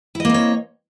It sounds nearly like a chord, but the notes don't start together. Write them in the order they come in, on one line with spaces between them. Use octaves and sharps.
E4 D#5 A#3 C4 C#5